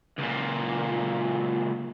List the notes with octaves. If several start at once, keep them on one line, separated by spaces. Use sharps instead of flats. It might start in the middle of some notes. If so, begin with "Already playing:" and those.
C#2 A#2